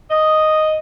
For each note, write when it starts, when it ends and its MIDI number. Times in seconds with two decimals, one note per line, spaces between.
0.11 0.78 75